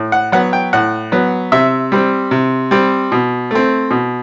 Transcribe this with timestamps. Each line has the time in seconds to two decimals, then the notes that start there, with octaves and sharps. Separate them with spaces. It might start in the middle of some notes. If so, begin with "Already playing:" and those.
Already playing: A2
0.12 F#5
0.32 F#3 B3 F#5
0.53 G5
0.73 A2 F#5
1.12 F#3 B3
1.52 C3 E5
1.92 G3 C4
2.31 C3
2.71 G3 C4
3.12 B2
3.51 A3 C4
3.91 B2